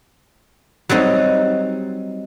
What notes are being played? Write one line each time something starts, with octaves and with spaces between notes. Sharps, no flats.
F#3 G3 C4 D#4